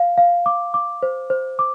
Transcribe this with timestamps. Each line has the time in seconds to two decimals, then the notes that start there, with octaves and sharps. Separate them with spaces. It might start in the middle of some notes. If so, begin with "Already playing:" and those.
Already playing: F5
0.18 F5
0.46 D6
0.74 D6
1.03 C5
1.30 C5
1.59 D6